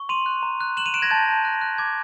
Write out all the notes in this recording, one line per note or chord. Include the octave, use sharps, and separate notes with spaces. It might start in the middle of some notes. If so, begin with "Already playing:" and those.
Already playing: C#6
C6 D#7 F7
F#6
A#5
F#6
F#6 E7 F#7
D#7 F7
F#6 D7 E7
G#6 A#6
A5 G6 A6
A5
F#6
F#6
D6 G#6